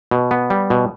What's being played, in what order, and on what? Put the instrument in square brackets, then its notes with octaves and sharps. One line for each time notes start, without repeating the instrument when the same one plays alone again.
[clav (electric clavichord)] B2
B3
G3
B2